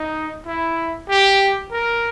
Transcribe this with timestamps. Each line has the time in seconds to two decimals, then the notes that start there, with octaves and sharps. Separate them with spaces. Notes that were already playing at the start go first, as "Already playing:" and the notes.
Already playing: D#4
0.46 E4
1.09 G4
1.71 A#4